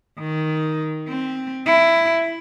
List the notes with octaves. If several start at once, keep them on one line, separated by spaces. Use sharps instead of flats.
D#3
C4
E4